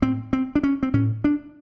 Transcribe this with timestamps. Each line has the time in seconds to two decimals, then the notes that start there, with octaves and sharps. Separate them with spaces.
0.02 A2 C4
0.33 C4
0.55 D4
0.63 C#4
0.83 C4
0.93 A2 C#4
1.24 D4